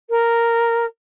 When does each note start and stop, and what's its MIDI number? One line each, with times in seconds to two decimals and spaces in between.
0.10 0.85 70